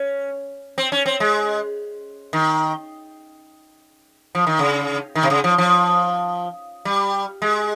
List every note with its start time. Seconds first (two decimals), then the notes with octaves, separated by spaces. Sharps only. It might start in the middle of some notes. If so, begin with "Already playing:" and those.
Already playing: C#4
0.78 C4
0.92 C#4
1.06 C4
1.20 G#3
2.33 D#3
4.35 F3
4.47 D#3
4.59 C#3
5.15 D#3
5.23 C3
5.30 C#3
5.44 F3
5.58 F3
6.85 G3
7.42 G#3